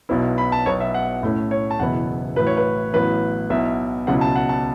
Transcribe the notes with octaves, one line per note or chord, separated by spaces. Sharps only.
B1 B2 B3 E4
B5
A5
B1 B2 B3 C#5
E5
F#5
A2 A3 C#4
C#5
A5
F#1 E2 B2 B3 E4 F#5
A1 A2 F#3 B4
C#5
B4
A1 A2 F#3 B3 E4 B4
B1 B2 B3 E4 E5
C#2 B2 F#3 C#4 E4 F#5
A5
F#5
A5